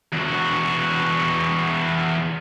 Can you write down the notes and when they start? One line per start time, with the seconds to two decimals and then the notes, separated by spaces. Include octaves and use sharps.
0.13 E2 F#4